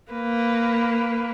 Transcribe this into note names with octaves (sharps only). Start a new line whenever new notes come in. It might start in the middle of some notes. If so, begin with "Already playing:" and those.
A#3 B4